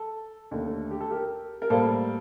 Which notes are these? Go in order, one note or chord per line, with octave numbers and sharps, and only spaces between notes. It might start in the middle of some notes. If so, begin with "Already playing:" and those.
Already playing: A4
D#2 D3 A3
G4
A4
G4 A#4
A#4
A2 G3 A#3 A4 C5